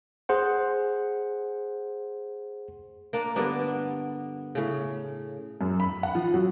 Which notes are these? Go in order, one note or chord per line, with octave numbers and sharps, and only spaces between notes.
G#4 C5 F#5
A#3 D4
G2 D3 B3 D4
A2 C#3
F#2
B5
F#5
F3
F#3